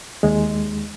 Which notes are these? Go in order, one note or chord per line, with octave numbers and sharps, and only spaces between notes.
D#2 G#3